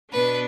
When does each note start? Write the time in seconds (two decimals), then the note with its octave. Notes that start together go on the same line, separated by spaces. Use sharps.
0.12 B2 B3 D4 B4